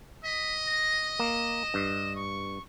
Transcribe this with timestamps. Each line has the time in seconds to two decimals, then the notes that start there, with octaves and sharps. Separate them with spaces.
0.25 D#5 B6
0.67 A#6
1.19 A#3 E7
1.74 G2
2.16 C#6